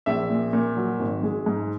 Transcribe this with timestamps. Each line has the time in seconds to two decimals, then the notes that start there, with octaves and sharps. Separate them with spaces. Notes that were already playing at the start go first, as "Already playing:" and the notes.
0.06 A#1 E5
0.30 A#2
0.53 A#2
0.77 F#3
0.99 G#1
1.23 G#3
1.46 G#2